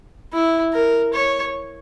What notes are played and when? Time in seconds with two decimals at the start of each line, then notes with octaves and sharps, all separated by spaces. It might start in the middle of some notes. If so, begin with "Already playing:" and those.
0.33 E4
0.73 A#4
1.13 C#5